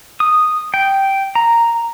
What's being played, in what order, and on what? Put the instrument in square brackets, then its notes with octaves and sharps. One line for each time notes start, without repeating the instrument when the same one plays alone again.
[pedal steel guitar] D#6
G5
A#5